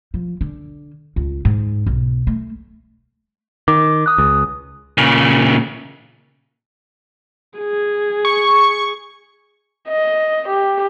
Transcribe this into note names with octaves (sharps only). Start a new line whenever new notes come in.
F3
D3
C#2
G#2
B1
A3
D#3 D6
D#6 F#6
C#2
A#2 C#3
G#4
C#6
D#5
G4